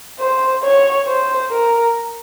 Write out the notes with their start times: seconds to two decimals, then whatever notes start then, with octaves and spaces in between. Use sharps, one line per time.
0.19 C5
0.63 C#5
1.06 C5
1.50 A#4